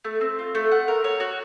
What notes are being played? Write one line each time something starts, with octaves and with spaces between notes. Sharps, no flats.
A3
C4
F4
A3
F#5
A#4
C#5
F#4